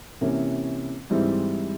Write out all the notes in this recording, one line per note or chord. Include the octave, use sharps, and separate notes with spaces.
C3 E3 A#3 C#4
G#2 E3 G3 C4 E4